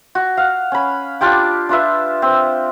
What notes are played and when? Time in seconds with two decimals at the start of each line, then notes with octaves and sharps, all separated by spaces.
0.15 F#4
0.37 F5 F#5
0.72 C#4 B5
1.21 D4 F4 G4 D6
1.69 D4 F4 B4 E5
2.22 C4